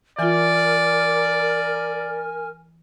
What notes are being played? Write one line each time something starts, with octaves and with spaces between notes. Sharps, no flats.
E3 F4 A#4 D5 G#5 F6